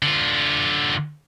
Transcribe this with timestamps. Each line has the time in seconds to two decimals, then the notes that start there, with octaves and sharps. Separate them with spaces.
0.02 D3 F4